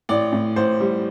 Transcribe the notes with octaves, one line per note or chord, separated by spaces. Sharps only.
A1 D5
A2
A1 C5
G3